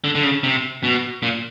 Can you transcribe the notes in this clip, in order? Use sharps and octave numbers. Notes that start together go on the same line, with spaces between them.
D3
D3
C#3
C3
B2
A#2